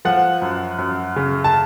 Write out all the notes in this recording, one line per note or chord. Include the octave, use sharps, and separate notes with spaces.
F3 F#5
F#2
F#2
C#3
A5